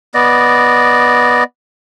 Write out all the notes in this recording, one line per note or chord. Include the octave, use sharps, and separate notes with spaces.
B3 D5 D#5